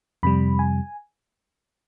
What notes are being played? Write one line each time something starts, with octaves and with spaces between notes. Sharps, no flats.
F2 C3 G3 B5
G#5